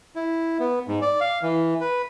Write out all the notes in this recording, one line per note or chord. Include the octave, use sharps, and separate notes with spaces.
E4
B3
G#2
D5
F5
E3
B4